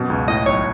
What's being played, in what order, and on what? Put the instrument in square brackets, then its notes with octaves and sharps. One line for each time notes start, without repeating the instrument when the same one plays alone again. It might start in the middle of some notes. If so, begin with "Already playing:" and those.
Already playing: [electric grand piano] F#2 B2
C#2
[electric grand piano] A2 [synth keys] D#5
[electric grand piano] B1 [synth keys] C#5